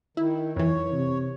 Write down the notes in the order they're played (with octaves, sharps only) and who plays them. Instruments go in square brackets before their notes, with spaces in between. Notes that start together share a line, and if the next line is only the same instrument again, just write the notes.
[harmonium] D#3 [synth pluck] E4
[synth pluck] F2 E3 [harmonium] C#5
[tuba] C3